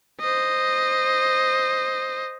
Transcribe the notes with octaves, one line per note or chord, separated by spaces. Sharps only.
C5 D#5